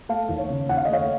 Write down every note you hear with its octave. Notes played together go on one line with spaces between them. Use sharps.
A3 F5 A5
D#2
C#5
C#3
D#2 F#5
F5
D#5
A3 C#5 F5